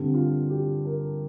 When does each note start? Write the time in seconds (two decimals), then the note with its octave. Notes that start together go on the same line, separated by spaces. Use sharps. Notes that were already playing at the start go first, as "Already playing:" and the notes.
Already playing: G2 D3 G3 C4
0.14 F4
0.50 G4
0.85 A#4